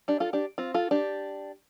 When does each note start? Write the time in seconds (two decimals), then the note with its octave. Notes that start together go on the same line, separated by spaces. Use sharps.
0.08 D4 G4
0.20 F4 A4
0.33 D4 G4
0.58 C4 F4
0.74 F4 A4
0.91 D4 G4